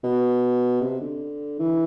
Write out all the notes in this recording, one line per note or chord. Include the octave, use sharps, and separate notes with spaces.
B2
C3
D3
E3